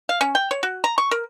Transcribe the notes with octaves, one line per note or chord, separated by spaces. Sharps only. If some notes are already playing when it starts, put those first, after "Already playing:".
F5
C#4
G5
C#5
F#4
A#5
C#6
A#4